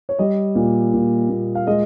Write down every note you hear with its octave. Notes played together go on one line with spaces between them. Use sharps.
C#5
G3 D#5
A#2
A#2
A#2
F5
G#3 D#5